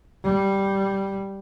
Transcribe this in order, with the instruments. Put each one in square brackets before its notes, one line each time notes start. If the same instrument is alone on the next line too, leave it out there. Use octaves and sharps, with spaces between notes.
[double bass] G3